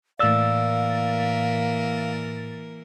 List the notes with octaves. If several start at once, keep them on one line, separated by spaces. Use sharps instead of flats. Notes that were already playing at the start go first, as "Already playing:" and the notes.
A2 E3 A#3 A#4 D5 F5 E6 A6